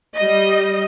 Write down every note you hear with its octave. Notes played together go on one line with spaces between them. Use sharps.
G3 D#5